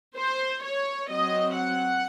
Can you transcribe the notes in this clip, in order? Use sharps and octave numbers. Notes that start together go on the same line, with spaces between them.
C5
C#5
F#3 C4 D#5
F#5